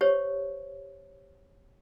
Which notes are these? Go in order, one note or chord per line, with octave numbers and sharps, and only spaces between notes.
G4 C5 C#5